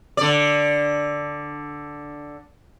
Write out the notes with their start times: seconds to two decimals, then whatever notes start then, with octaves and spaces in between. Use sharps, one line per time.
0.17 D3 D5